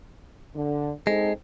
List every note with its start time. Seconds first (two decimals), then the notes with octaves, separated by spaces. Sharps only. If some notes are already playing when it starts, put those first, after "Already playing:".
0.55 D3
1.07 G#3 C4 D#4 A4